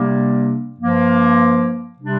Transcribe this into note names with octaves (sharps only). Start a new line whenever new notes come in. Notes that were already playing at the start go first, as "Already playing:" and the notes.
Already playing: C3 G3 A#3 D4
G2 F3 A#3
C3 G3 D4